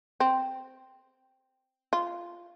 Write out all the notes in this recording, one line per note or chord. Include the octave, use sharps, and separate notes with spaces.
C4
F4